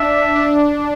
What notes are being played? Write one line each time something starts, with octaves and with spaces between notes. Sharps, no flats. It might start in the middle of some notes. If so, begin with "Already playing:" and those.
Already playing: D4 E5
D4